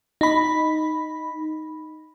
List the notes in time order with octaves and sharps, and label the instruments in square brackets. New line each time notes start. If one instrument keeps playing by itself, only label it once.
[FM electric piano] D#4 B5